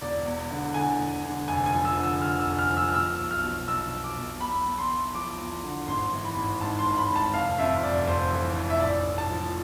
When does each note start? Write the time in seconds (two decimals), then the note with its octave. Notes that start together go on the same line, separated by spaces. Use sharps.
0.01 E1 D5
0.26 E2
0.51 D3
0.74 D3 G#5
0.99 E1
1.24 D3
1.48 F1 G#5
1.66 G#5
1.73 F3
1.85 E6
1.97 D3
2.03 E6
2.22 D3 F6
2.40 E6
2.46 F1
2.59 F6
2.70 F3
2.77 E6
2.89 F6
2.94 B2 E6
3.19 B1
3.31 F6
3.43 B2
3.68 B1 E6
3.92 B2
4.04 D6
4.17 B1
4.41 E2 B5
4.66 E2
4.78 C6
4.89 E2
5.14 F3 D6
5.39 E2
5.63 D3
5.88 G#1 C6
6.13 E3
6.24 B5
6.36 G#1
6.61 G#2 A5
6.79 C6
6.86 G#1
6.98 B5
7.10 G#1
7.16 A5
7.34 F1 F5
7.58 F2 E5
7.83 F1 D5
8.07 F1 C5
8.32 E3
8.56 F1
8.70 E5
8.80 A1 D5
9.05 A1
9.18 A5
9.30 F3